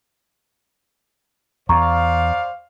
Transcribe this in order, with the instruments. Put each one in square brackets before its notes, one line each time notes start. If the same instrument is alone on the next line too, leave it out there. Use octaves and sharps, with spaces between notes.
[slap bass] E2 [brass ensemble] C5 D5 F5 [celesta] A#5 C#6